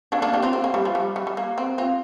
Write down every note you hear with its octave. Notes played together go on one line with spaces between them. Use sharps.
A#3 D4
A#3 D4
D4 G4
C4 F4
C4
A#3
G3
F3
G3
G3
G3
A#3
C4
C4 F4